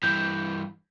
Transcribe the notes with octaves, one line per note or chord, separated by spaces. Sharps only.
G2 E3 G6